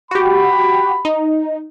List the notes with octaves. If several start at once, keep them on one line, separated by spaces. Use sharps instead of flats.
F#4 G4 B5
D#4